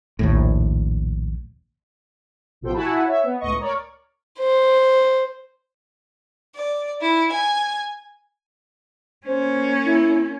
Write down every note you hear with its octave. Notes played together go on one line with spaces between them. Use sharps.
A#1 D#2 A2
A1 B2 F3 A4 C5 G5
E4 F#4 F#5 G#5 A5 B5
C#5 E5
B3
C#2 A2 B3 D#5 C#6
A#4 C#5 D5
C5
D5
E4
G#5
A#3 C#4 C5
E4